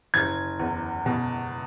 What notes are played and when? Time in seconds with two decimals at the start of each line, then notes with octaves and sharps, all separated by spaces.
0.14 F#1 G#6
0.59 E2
1.06 B2